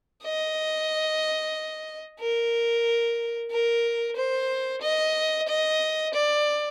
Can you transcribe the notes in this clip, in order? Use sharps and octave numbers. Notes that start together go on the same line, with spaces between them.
D#5
A#4
A#4
C5
D#5
D#5
D5